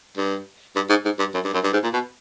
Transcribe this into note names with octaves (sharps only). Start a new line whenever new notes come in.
G2
G2
G#2
G#2
G2
F#2
G2
F#2
G2
G#2
A#2
B2